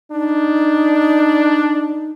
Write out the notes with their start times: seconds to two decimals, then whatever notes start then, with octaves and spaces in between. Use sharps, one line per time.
0.11 D4 D#4